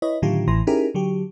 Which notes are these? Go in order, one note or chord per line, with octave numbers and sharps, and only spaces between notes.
E4 B4 C#5 D#5
A2 D3 D#3 F#3 F4 G4
A1 A2 E3 C6 A#6
C#4 D#4 E4 G4 G#4 A#4
D3 F#3 G4